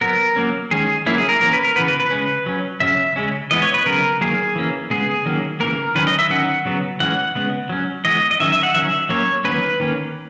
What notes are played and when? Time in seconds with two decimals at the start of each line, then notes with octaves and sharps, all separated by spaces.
0.01 F#3 B3 A#4
0.36 F#3 A#3 C#4
0.71 D#3 G#3 C#4 G#4
1.06 F#3 A#3 C#4 E4
1.18 G#4
1.29 A#4
1.41 E3 A#3 C#4 A#4
1.53 B4
1.64 A#4
1.76 C#3 E3 B3 B4
1.88 B4
2.00 B4
2.11 C#3 G#3 C#4
2.46 F#3 C#4
2.80 C#3 F#3 C#4 E5
3.16 C#3 G#3 C#4
3.51 E3 G#3 B3 D#5
3.62 C#5
3.74 B4
3.86 C#3 F#3 B3 A#4
4.21 D#3 F#3 A#3 G#4
4.56 E3 A#3 C#4
4.90 C#3 G#3 B3 G#4
5.26 D#3 F#3 A#3 C#4
5.60 C#3 E3 A#3 A#4
5.95 D#3 F#3 C#4 B4
6.07 D#5
6.19 E5
6.30 D#3 F#3 C#4 F#5
6.65 C#3 F#3 B3
7.00 E3 G#3 C#4 F#5
7.35 C#3 G#3 B3
7.69 F#3 C#4
8.05 E3 G#3 B3 D#5
8.31 D#5
8.40 D#3 F#3 C#4 E5
8.52 E5
8.63 F#5
8.75 D#3 F#3 C#4 E5
9.09 F#3 A#3 C#4 C#5
9.44 D#3 F#3 A#3 C#4 B4
9.80 D#3 A#3 C#4